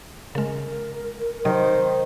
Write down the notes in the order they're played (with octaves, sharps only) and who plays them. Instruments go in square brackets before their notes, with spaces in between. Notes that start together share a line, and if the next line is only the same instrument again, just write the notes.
[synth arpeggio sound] C#3 G#3 [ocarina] A#4
[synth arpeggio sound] C3 F#3 [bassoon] D#3 [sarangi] C5